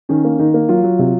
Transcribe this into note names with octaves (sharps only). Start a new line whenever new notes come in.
D#3 C#4
A#3
D#3 D#4
A#3
F#3 F4
F#3
C3